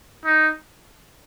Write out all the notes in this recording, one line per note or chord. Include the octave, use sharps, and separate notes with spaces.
D#4